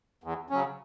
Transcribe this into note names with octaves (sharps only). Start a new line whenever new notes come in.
E2
C#3 F#3 C#4